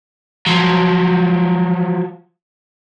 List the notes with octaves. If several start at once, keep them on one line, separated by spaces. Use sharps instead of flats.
F3 F#3